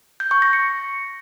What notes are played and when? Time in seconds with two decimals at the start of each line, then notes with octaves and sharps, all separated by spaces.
0.20 G6
0.31 C#6
0.42 A#6
0.53 C#7